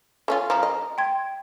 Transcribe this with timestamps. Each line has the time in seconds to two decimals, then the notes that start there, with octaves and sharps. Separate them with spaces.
0.28 A3 C#4 F4
0.50 F3 A#5
0.63 D#5
0.98 G5 C6 G#6